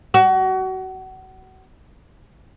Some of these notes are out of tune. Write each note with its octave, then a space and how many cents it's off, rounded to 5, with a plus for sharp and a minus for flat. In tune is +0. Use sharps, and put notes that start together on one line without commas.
F#4 +30